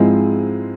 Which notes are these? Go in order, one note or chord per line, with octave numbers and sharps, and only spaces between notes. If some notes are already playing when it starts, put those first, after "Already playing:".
Already playing: G#2 F3 G#3 C4 E4